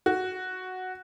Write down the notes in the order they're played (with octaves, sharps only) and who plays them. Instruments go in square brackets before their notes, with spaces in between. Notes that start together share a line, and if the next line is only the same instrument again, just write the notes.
[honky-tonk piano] F#4